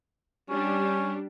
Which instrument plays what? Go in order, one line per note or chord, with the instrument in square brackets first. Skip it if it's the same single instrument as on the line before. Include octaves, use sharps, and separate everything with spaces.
[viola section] G3 D4 G4 [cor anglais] C#4